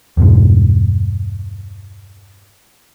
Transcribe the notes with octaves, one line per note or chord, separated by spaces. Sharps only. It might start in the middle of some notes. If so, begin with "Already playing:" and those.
E2 G2 B2 G#3